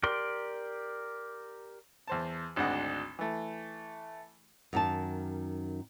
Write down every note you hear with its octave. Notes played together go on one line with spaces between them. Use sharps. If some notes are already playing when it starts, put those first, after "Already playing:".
G4 A#4 D5 C6
E2 C5 A5
G#1 D2 D4 D#5 F#5
E3 A3
F#2 D#3 A5